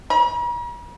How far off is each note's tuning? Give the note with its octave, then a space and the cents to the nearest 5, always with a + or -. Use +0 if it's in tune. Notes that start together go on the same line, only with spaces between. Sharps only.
A#5 +45